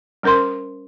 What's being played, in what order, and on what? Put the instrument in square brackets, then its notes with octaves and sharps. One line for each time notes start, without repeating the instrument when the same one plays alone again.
[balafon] G3 C#4 A#4 C5 C6